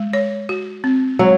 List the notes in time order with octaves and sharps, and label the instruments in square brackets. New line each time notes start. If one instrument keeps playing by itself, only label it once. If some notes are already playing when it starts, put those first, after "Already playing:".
Already playing: [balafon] G#3
C#5
F#4
C4
[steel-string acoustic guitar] F#3 [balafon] G#3